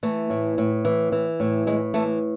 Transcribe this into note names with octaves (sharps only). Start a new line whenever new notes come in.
E3 A3
A2
A2
E3
E3
A2
A2 G#3
E3 A3